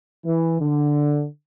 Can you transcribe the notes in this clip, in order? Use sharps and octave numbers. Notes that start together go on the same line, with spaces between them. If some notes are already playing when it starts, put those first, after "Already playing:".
E3
D3